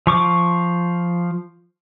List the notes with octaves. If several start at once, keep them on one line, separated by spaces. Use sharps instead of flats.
F3 C#6 D6